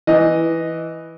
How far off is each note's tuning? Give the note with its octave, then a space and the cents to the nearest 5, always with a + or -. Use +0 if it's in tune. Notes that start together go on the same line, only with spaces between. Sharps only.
E3 +0 D#5 +0